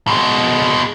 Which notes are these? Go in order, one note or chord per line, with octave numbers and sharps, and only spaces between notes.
B2 G#3